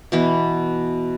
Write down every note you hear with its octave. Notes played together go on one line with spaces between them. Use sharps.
B2 E3 B3